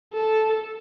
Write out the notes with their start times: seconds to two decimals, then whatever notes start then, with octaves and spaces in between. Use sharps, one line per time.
0.14 A4